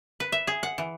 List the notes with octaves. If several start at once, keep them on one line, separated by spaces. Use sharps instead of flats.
B4
E5
G#4
F#5
E3